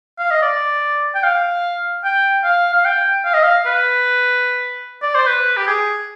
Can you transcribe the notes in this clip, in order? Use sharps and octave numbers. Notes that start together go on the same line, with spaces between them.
F5
D#5
D5
G5
F5
G5
F5
F5
G5
F5
D#5
F5
B4
D5
C5
B4
G4
G#4